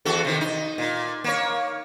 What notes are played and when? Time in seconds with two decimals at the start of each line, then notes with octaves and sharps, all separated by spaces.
0.05 E2 F#4 A4
0.25 C3 D#3
0.41 D#4
0.78 A#2
1.24 A#3 C#5